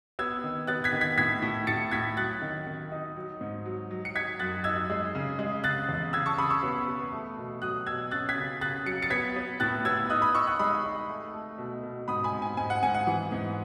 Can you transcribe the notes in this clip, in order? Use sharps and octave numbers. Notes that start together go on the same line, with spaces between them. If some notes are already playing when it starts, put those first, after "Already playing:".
B3 E6 G#6
D#3
B3 F#6 A6
G#6 B6
D#3
G#6 B6
A2 G#6 B6
A2
A2 A6 C#7
A2 G#6 B6
F#3 F#6 A6
D#3
D#3
D#4
F#3
G#2
F#3
F#3
C#7
D#4 G#6 B6
F#2 F#6 A6
D#4 E6 G#6
G#3
C#3
G#3
C#3 F#6 A6
E2
C#3 E6 G#6
A5 C#6
C#3 B5 D#6
C#6 E6
B3
B3
A3
B2
F#3 D#6 F#6
B2 E6 G#6
C#4 F#6 A6
G#6 B6
C#3
C#3 F#6 A6
F#3 C#7
A6 C#7
B3 G#6 B6
B3
A2 F#6 A6
B3 E6 G#6
D#4 D#6 F#6
B5 D#6
D#4 C#6 E6
D#6 F#6
G#3 B5 D#6
D#4
A3
A3
B2
B2
G#2 B5 D#6
G#5 B5
G#2
G#5
G#2 G#5
F#5
G#2 G#5
F#5
E3
G#2